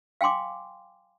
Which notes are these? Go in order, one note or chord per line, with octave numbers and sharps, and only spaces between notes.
F5 G5 G#5 C6 D6